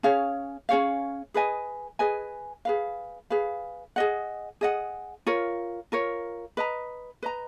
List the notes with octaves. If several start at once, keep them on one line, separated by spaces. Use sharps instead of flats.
C#4 G#4 C#5 F5
C#4 G#4 C#5 F5
G#4 B4 D#5 G#5
G#4 B4 D#5 G#5
G#4 B4 F5
G#4 B4 F5
G#4 D#5 F#5
G#4 D#5 F#5
F4 A#4 C#5
F4 A#4 C#5
B4 D#5 A#5
B4 D#5 A#5